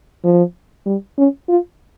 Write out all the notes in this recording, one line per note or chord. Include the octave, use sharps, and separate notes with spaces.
F3
G3
C#4
F4